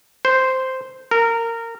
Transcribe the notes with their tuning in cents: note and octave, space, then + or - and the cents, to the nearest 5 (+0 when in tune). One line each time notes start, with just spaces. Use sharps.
C5 -5
A#4 -20